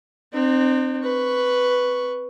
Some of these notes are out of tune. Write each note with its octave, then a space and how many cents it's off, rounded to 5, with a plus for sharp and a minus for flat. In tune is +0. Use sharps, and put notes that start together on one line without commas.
C4 +0 D#4 -45
B4 +0 C#6 +0